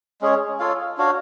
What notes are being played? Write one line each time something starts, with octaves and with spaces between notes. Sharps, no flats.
G#3 C#4 G#4 C#5
F4 A4 C#5 F5
D4 F#4 C#5 F5